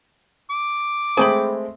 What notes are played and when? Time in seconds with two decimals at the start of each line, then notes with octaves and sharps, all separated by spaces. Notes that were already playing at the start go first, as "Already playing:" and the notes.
0.50 D6
1.17 G#3 A3 C4 G#4 G5 B5